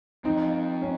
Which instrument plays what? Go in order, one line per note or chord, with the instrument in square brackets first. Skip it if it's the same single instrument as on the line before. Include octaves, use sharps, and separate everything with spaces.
[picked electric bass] F3 C4 [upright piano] D#4
[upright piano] C#4